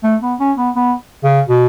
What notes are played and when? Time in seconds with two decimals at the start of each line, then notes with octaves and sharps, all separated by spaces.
0.04 A3
0.22 B3
0.40 C#4
0.57 B3
0.76 B3
1.24 C#3
1.48 B2